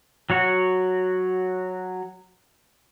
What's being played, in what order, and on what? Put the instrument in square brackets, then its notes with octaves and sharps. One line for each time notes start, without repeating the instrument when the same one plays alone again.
[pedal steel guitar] F#3 F#4 C#5